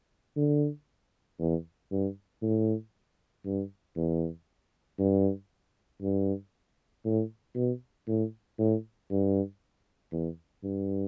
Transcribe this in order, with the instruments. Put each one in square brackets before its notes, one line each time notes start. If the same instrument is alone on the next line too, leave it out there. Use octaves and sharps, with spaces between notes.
[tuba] D3
E2
G2
A2
G2
E2
G2
G2
A2
B2
A2
A2
G2
E2
G2